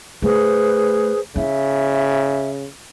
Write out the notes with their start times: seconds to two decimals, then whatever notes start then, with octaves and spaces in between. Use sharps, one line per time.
0.22 A3 G#4 B4 C5
1.36 C#3 E4 E5